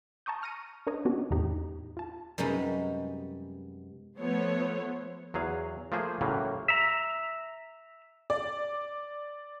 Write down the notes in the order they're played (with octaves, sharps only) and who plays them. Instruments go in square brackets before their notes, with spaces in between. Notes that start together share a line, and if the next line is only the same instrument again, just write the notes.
[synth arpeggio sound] A5 A#5 C#6 D#6 G6
C#6 F6 A#6 C#7 D#7
D4 A#4 B4 C#5 D#5
B3 C#4 D4 F#4 G4
E2 A2 D#4 G4
F4 A5
[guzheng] F#2 C3 G3 G#3 B3 D#4
[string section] F3 A3 B3 C5 C#5
[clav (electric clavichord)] E2 F#3 G#4 F5
F3 A3 A#3 G#4 C5
A2 C#3 E3 F#3 G3 A#3
[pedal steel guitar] E5 A#5
[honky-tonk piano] D5